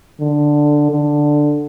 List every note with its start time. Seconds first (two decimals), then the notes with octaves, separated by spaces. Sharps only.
0.21 D3
0.92 D3